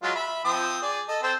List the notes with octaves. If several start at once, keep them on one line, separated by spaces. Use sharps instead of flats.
F#3 G#3 F4
E5 B5
F3 C4 D#6
G#4 D5
A4 D#5
C4 A4 C5